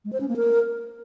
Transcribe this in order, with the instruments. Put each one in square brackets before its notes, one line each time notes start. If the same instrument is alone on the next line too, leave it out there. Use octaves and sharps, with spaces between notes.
[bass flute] G#3
C5
C#4
A#3
A#4